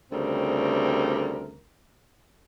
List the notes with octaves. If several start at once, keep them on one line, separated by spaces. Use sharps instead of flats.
D2 C#3 G3 C4 A#4